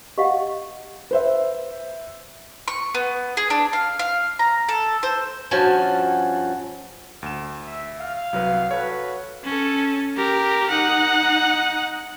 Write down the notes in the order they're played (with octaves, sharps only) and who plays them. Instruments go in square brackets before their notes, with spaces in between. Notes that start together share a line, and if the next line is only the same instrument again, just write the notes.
[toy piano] G4 D#5 F5 F#5
[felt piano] B4 C5 E5
[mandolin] C#6
B3
G#4
D4
F5
F5
A#5
A4
C5
[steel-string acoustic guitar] G2 F3 C#4 F#4 G#5 A5
[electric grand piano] D2 E7
[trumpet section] E5
F5
[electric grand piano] C2 F#3 B4
[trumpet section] F#4 A4 B4 [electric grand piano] C#5
[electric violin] C#4 A4
G4 A#4
D#4 F#5